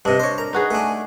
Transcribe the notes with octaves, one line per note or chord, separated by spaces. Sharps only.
G2 C3 D4 D#5
C5 C#5
A#4 A#5
D#4 F#4 G#4 B4
A3 D4 G#5